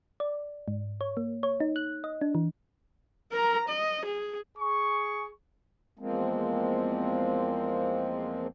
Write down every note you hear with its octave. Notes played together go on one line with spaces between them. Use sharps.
D5
G#2
C#5
A#3
C#5
D#4
F#6
D#5
D4
E3
A#4 A#5
D#5
G#4
G#4 C#6
E2 F3 G#3 A#3 C4